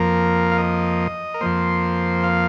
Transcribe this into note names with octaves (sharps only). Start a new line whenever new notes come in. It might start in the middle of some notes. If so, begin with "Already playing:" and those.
Already playing: F2 F3 A#3 A#4
F5
D#5
A#4
F2 F3 A#3 C5
F5